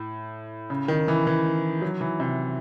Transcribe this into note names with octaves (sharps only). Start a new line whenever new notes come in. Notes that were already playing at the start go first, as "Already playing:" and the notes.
Already playing: A2
C#3
D#3
E3
E3
F#3
E3
C3